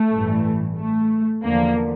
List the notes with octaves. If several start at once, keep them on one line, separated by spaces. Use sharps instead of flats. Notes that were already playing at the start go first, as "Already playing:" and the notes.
Already playing: A3
A1 G2 E3
A3
E2 D3 F3 A#3